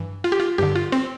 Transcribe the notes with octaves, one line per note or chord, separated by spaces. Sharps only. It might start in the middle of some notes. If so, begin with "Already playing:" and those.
Already playing: G2 E3
F4
G4
F4
G2 D3 G4
F4
C4